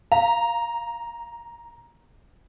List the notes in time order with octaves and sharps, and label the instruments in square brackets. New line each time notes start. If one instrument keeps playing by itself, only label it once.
[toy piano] F5 [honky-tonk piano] A#5